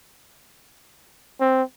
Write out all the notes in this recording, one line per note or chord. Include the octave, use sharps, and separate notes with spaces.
C4